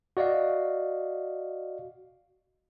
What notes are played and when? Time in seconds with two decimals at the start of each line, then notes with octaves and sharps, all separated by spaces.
0.17 F#4 D5 D#5 F5